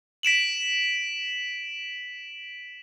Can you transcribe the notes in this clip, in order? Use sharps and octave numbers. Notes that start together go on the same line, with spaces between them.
B6 D7 E7 F#7